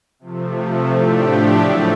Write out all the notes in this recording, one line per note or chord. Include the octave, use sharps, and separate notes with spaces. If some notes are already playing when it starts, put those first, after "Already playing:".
C3 F3 A3
A2 F3 A3 D4 G4
C#3 F#3 A3